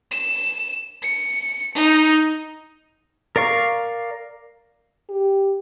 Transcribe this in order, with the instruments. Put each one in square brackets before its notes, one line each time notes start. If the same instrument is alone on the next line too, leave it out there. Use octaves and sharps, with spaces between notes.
[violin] E7
C#7
D#4
[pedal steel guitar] A#4 D5 F5 C#6
[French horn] G4